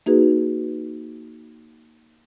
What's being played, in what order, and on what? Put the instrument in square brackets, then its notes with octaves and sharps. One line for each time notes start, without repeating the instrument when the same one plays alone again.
[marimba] A#3 D#4 F#4 G#4 B4